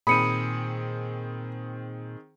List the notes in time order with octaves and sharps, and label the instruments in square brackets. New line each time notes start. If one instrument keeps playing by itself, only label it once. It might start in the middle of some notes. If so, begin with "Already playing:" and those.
[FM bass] A#2 [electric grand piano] D#3 C4 G#4 [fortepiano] B5 [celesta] D#6 C#7 D#7